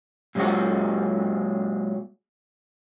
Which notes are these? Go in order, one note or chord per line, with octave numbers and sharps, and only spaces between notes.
A#2 F#3 G#3 A#3 F#5